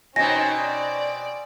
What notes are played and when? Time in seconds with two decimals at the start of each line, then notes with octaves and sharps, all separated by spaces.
0.16 B2 C4 C#4 D#4 G#5 A#6
0.59 D5